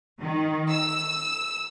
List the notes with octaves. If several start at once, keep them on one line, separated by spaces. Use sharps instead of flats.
D#3
E6